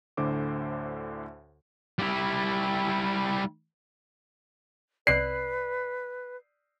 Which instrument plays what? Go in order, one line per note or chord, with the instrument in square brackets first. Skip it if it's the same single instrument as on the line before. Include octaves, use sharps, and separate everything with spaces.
[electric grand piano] D2 A2 D3 C5 D6
[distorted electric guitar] G3 E4
[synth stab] C2 C3 F#6 [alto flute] B4 [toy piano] D5 [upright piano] C7